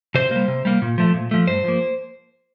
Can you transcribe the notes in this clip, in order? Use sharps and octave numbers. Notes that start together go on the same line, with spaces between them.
C3 C5
G3 A#3
C3
G3 A#3
A#2
F3 A3
A#2
F3 A3
G2 C5
F3 A#3